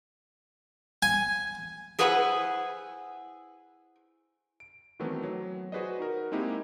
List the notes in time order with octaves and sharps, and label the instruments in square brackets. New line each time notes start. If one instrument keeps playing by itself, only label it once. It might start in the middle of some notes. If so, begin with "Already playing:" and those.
[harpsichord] G#5
[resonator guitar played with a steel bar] E4 G#4 B4 C5 F#5
[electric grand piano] D7
D#3 E3 F#3 A3 B3 C4
F#3
F#4 G#4 B4 C5 D5 D#5
D#4 F#4 A#4
G#3 A#3 C4 D#4 E4 G4